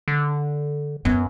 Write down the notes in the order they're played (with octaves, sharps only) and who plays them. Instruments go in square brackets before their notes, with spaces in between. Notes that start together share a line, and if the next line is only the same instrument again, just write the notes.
[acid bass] D3
[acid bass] F#2 [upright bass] B3